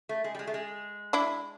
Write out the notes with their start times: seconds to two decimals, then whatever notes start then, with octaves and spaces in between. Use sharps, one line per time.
0.09 A3
0.24 G#3
0.35 G3
0.39 G#3
0.47 A3
0.54 G#3
1.13 D4 E4